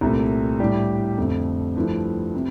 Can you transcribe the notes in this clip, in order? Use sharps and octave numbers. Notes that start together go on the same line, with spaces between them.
C2 A#2 A3
A2 G3 D4 G4
F2 D3 A3
G2 F3 A3 E4
C3